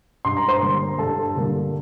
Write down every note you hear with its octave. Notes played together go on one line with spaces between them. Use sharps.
G2 C6
A#5
C5 C6
D3 G3 A#3
G2 A4 A5
D3 G3 A#3